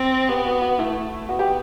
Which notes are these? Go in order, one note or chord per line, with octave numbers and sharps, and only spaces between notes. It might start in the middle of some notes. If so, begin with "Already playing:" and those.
Already playing: C4
B3 G4
F#4
F#4
A3 E4
B3 F#4
G4